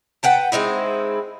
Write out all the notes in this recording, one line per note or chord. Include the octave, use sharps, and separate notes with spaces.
B4 F#5 G5 A5
G#3 C4 D#4 E4